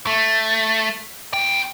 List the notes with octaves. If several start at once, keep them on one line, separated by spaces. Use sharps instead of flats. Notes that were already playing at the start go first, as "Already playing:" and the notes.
A3
E2 G5